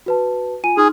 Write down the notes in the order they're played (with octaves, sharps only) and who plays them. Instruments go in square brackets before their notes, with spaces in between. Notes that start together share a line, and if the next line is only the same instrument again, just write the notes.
[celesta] F#4 B4 A5
F4 G#5 D#7
[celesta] D#4 C6 F6 [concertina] G#4